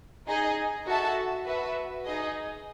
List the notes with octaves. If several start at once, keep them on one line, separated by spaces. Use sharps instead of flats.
D#4 G#4 D#5
F#4 A4 E5 A5
F#4 B4 E5
D#4 G#4 D#5